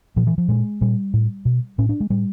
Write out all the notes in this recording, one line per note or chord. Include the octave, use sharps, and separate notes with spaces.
A#2 F3
E3
F3
A#2 G#3
A#2 G3
A2
B2
A2 C#4
D4
G#3
A2 G3